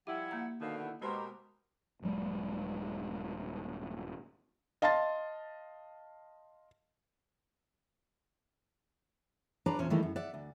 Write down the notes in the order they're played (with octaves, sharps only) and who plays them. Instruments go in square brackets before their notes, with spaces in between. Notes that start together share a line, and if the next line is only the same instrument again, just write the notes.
[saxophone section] F3 G3 E4 [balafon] G4 [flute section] F#5 G#6
[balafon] A#3 A#5
[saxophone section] B2 D3 D#3 [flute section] F5
[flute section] E4 F#5
[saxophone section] B2 A#4 [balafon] G#3 C5 [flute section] G4 A#5 C6
[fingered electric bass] D#1 G2 F#3 G#3
[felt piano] D#5 F5 A5 C6 A6
[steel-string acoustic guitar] F#3 D4 B4 C#5 D5 A#5
E2 A#2 C#4 C5
D#3 E3 G3 A3 A#3
F#2
D5 E5 F#5
D2